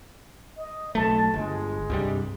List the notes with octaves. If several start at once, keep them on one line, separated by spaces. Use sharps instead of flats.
D#5
B1 A3 A5
G1 G#3
C2 G2 G3